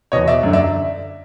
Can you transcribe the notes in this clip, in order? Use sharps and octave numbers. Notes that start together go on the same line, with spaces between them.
E2 B2 C#5 D#5
D5 E5
F#2 D3
D5 E5